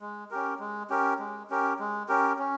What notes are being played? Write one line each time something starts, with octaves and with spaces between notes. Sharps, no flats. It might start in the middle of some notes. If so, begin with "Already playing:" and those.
G#3
C#4 G4 A#4
G#3
C#4 G4 A#4
G#3
C#4 G4 A#4
G#3
C#4 G4 A#4
C#4